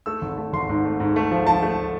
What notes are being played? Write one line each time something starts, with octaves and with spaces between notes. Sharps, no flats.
A3 E6
G#1
A3
G#1 C6
G#2
A3
G#2
A3
F3
F3 A5
A3